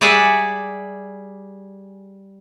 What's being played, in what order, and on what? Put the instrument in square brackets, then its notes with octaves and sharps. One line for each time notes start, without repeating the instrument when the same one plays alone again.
[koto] G3 G#4 D5 E5 F#5 G#5